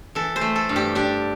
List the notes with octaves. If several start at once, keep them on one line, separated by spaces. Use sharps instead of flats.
E3 A4
C5
A3
A4
G2
G4
D4 G4